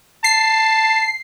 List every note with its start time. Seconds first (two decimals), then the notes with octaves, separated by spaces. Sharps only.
0.24 A5 C7